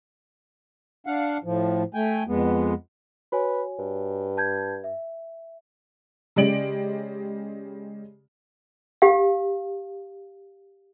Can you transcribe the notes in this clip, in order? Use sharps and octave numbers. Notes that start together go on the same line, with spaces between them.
D4 F5 F#5
A2 F3
A3 G5 G#5
F2 G#3 B3
F#4 B4 C#5 G#5
G2
A5 G6 G#6
E5
C#3 G#3 G4 D5 D7 F#7
G4 F5